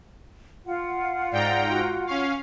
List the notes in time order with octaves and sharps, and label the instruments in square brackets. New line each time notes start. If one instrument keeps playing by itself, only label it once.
[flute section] F4 F#5
[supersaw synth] G#2 G5 A#5 [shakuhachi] D5
[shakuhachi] F#4
[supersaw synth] C#4 F5 [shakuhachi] C#6